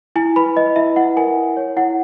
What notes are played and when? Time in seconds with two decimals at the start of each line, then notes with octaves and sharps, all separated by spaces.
0.16 E4 G#5
0.36 B4 B5
0.56 B4 D#5
0.76 E4 E5
0.96 E4 F#5
1.17 A#4 G#5
1.37 E4
1.57 C#5
1.77 E4 F#5